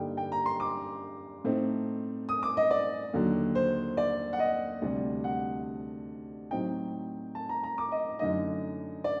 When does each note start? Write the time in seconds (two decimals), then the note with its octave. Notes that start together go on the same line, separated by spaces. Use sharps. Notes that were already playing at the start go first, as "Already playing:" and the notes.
Already playing: G2 D3 G3 A#3 D#4 G5
0.17 G5
0.32 A#5
0.46 C6
0.60 D6
1.44 A2 A3 C4 D#4
2.29 D#6
2.43 D6
2.57 D#5
2.71 D5
3.13 D#2 D3 F#3
3.55 C5
3.97 D5
4.33 F#5
4.39 D#5
4.82 D2 C3 G3 D4
5.24 F#5
6.51 A2 F#3 C4 D#4 G5
7.35 A5
7.49 A#5
7.64 A#5
7.78 D6
7.92 D#5
8.19 F#2 D3 A3 D#4 D#5
9.04 D5